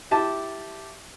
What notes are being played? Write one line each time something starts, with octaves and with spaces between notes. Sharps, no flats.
E4 G4 A5